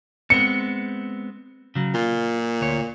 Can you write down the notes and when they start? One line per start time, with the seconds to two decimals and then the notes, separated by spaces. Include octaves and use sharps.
0.30 G#3 B3 C4 C#7
1.75 C#3 F#3
1.95 A#2 F4
2.61 D2 C#5